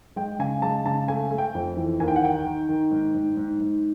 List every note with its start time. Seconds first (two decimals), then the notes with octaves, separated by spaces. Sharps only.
0.16 G#3 G5
0.39 C#3 G#5
0.62 G#3 A5
0.86 C#3 A5
1.08 A3 G#5
1.31 A3
1.38 G5
1.55 F2
1.77 E3
2.00 D#2 G#5
2.08 G5
2.16 F#5
2.23 D#3 G5
2.46 D#3
2.69 D#3
2.91 G#2
3.14 G#2
3.37 G#2
3.60 G#2